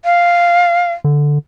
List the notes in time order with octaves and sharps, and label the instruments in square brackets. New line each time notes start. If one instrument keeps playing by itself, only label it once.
[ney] F5
[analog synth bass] D3